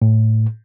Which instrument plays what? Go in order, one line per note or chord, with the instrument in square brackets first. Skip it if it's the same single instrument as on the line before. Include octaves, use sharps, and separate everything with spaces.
[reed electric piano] A2